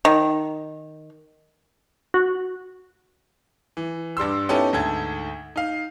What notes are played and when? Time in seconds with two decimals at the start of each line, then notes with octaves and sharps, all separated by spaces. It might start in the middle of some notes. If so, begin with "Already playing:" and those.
0.05 D#3
2.14 F#4
3.77 E3
4.17 G2 G3 C6 E6
4.49 B3 C#4 D#4 E4 G4 A4
4.73 D2 G#2 A4 G#6
5.56 D#4 F5